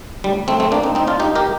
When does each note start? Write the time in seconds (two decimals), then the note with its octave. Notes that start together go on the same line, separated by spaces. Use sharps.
0.24 D2 G3
0.48 D2 A3 C4
0.60 A3 C4
0.72 D2 A#3 D4
0.83 C4 D#4
0.95 D2 C4 D#4
1.07 D4 F4
1.20 C2 D#4 G4
1.36 G4 A#4